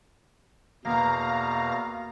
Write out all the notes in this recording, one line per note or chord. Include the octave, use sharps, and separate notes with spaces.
E2 B2 A#3 F5 A#5 A#6